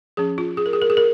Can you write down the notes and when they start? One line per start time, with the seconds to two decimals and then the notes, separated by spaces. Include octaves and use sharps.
0.17 F3 C#4 G#4
0.38 F4
0.57 G#4
0.66 A#4
0.73 G#4
0.82 A#4
0.90 G#4
0.97 A#4